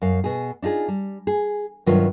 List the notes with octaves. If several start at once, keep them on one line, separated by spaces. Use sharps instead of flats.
F#2 F5
B2 G#4
D4 D#4 F4 G#4
G3
G#4
G2 C3 D#3 F#3 F4 B4